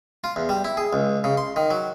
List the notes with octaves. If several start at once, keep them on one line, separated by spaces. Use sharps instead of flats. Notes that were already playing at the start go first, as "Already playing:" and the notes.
F4
E2
G3
E4
G#4
C#2
C#3
C6
D#3
F#3